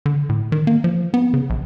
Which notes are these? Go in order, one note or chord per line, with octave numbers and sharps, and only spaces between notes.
D3
A2
D#3
A#3
F3
B3
C#3
A#1